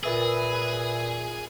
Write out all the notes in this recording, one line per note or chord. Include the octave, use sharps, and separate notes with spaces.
A#2 G#4 A#4 B4 E5 E6